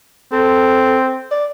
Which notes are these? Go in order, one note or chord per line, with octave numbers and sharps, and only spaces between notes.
C4 A4
D5